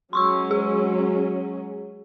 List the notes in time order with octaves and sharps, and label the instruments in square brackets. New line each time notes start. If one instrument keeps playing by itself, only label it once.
[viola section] F#3 G#3 C#4 [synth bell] C6 C#6 E6
[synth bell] G#4